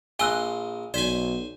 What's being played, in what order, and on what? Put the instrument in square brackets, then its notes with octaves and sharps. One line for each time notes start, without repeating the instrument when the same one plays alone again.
[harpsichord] A#1 D#5 C6 [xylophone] G#5 E6 F#6
[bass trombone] B1 [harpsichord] C5 G#5 [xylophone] D5 B6